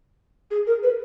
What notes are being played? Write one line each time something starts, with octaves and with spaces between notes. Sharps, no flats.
G#4
A#4
B4